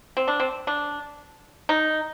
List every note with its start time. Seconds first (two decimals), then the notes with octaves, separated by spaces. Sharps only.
0.17 C4
0.28 D4
0.40 C4
0.67 D4
1.69 D#4